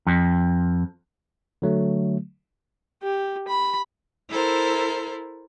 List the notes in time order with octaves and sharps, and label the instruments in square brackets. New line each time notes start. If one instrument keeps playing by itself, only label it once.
[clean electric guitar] F2
[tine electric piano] D3 F#3 A3
[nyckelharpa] G4
B5
[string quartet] E4 A4 A#4 C5